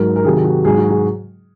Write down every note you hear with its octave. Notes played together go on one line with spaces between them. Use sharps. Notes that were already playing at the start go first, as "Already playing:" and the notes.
Already playing: G#2 F#3 A#4
A#4
C3 D#3 F#3 G#4
F#4
G#2 F#3 G#4
F#4
G#4